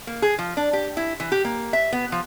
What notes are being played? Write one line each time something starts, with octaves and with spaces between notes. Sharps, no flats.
A#3
G#4
F3
D4
G4
E4
E3
G4
A#3
E5
B3
F3